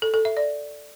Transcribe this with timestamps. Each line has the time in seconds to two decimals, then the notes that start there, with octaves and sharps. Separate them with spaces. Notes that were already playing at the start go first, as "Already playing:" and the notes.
0.02 A4
0.14 A4
0.25 E5
0.37 D5